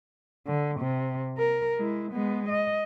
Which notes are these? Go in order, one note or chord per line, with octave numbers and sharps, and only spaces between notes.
D3
C3
A#4
G#3 E4
G#3 B3
D#5